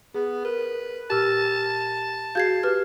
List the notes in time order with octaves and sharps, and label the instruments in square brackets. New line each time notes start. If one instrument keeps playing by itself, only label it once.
[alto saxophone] B3 [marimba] G#4
[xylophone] A#4 [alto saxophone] B4
[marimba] A#2 A#4 [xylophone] G4 E6 F6 [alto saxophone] A5
[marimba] F#4 G#4 F5 [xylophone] G6 G#6 C7
[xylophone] G4 B4 F6